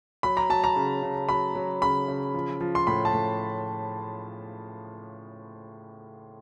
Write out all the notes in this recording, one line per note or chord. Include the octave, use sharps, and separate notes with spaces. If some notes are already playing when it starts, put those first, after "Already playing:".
F#3 B5
A#5
F#3 A5
A#5
C#3
C#3
F#3 B5
F#3
C#3 B5
C#3
F3
F3
C6
A2 B5
A5
A2